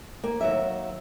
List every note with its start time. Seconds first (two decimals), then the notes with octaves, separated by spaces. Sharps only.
0.24 A#3
0.41 D#2 F#3 E5